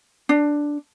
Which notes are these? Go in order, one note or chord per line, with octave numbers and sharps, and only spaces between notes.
D4